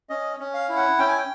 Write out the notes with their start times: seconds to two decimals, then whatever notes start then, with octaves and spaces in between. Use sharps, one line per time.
0.10 C#4 D#5
0.40 C#4
0.54 F5
0.69 E4
0.76 F#5
0.99 C#4 G5
1.08 G#5
1.18 G5